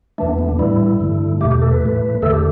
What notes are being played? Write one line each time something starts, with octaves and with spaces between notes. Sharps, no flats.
E2 E3 A3 D4
B3
B3
D4
A2 E3 G3 E4
G2 D3 A3
E2 B2 A3 G4
G4
A4
B4
A2 E3 A3
E2 D3 A3 A4
G4